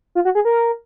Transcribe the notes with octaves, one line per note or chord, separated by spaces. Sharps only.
F4
F#4
G#4
A#4